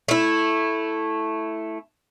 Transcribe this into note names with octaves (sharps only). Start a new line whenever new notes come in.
A3 E4